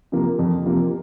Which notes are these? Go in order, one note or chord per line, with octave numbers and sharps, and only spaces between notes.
C3 F3 A#3
F2
C3 F3 A#3